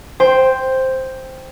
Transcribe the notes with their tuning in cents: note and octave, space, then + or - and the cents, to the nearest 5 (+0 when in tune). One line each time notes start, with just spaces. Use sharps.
C5 +0 G5 +5